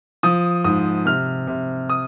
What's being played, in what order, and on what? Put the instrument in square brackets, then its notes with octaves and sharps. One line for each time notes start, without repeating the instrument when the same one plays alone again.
[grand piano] F3 D#6
G#2 D#6
C3 F6
C3
D#6